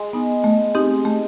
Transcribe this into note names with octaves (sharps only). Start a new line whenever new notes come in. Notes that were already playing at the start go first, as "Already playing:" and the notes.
Already playing: G#3
B3 D#4
A3
C4 D#4 G4
A3